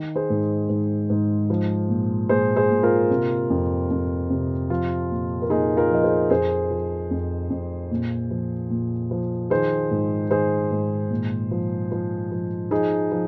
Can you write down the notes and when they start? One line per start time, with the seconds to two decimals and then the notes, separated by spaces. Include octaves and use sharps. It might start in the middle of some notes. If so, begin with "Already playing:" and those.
Already playing: D#3
0.16 G#4 C5
0.30 G#2
0.69 G#2
1.10 G#2
1.50 F3
1.89 A#2
2.29 A#2 G#4 C5
2.56 G#4 C5
2.70 A#2
2.83 F4 A#4
3.10 C3
3.50 F2
3.91 F2
4.30 C3
4.70 F3 F4
5.11 A#2
5.42 A#4
5.50 A#2 D#4 G#4
5.77 F4 A#4
5.90 F3 D#5
6.03 G#4 C5
6.30 F2 G#4 C5
6.71 F3
7.11 F2
7.50 F2
7.91 A#2
8.31 F3
8.70 A#2
9.11 F3
9.50 D#3 G#4 C5
9.91 G#2
10.31 D#3 G#4 C5
10.71 G#2
11.10 A#2
11.51 F3
11.92 F3
12.32 F3
12.71 F3 D#4 G#4
13.12 F3